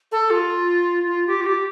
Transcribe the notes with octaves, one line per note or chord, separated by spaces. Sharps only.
A4
F4
F4
G4
F4
G4